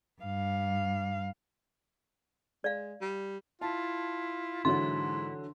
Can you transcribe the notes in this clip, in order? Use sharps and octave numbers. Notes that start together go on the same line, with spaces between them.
G2 F5
G#3 D5 F5
G3
E4 F4 A5
G#2 D3 E3 F#3 C6